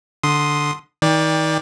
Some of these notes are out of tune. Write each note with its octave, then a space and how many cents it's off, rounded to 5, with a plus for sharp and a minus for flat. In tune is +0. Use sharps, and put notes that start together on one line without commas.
D3 +0 C6 +0 D#6 +0
D#3 +30 D5 +0 G5 +25